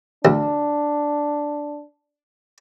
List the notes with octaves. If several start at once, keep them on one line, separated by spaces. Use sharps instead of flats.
D2 D4